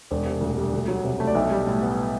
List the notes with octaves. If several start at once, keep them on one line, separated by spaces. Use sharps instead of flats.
E1 C5
C3
D2
G3
D2
F#3
C3
A3
D5
B1 E5
G3
A2
B3